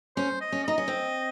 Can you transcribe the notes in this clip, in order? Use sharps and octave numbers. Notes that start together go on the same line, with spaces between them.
C#4 C5
D#5
C#4
D#4 D#5
C#4
C4